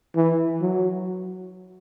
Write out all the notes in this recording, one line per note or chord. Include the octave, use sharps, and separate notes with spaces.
E3
F#3